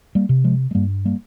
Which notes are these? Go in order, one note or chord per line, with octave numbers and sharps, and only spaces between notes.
G3 A#3
C3
F3 G#3
G#3
G2 G3 A#3
G3 A#3